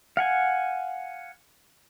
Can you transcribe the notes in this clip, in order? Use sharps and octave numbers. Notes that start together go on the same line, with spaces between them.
F5 F#5 G#5